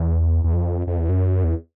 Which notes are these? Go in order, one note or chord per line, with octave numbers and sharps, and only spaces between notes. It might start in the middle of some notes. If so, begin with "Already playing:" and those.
Already playing: E2
E2
F2
F2
E2
F#2
E2